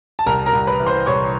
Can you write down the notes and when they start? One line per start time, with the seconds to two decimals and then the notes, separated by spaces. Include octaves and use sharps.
0.19 A5
0.26 C2 A#4 A#5
0.46 A#4 A#5
0.53 C2
0.67 B4 B5
0.80 E3
0.86 C5 C6
1.06 C2 C#5 C#6